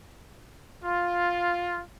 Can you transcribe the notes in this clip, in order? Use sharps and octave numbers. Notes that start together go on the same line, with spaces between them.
F4